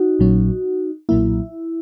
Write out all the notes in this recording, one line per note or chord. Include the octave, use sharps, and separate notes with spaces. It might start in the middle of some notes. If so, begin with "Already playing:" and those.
Already playing: D#4 F#4
A#1 A#2 F#3 C#4
B1 A#2 F#3 A#3 E4